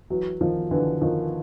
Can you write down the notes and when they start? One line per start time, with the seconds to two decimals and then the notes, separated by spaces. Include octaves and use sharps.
0.10 E3 F#3
0.41 D#3 F3
0.71 D3 E3
1.01 D#3 F3